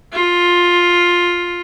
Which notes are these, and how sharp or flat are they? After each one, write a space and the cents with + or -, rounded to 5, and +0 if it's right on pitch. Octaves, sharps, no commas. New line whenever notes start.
F4 +10